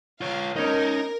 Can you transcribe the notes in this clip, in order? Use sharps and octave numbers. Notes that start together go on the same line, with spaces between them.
F4 C#5 F5
C#4 D#4 A#4 C#5 D#5